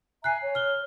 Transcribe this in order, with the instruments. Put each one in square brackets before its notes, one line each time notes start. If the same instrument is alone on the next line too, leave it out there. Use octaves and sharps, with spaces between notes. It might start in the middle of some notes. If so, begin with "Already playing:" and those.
[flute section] E5 G#5 A#5 [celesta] F#6 C7
[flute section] C#5
[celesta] F6 G7